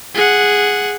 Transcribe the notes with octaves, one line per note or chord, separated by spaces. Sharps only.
G#4 F#5